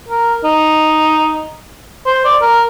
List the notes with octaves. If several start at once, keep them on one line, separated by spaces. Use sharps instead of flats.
A#4
D#4
C5
D5
A#4